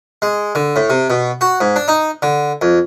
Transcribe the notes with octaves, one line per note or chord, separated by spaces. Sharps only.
G#3
D3
A2
C3
B2
F#4
G#2
D4
D#4
D3
F2